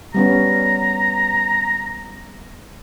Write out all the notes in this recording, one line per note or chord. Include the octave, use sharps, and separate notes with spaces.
G3 B3 C#4 A#5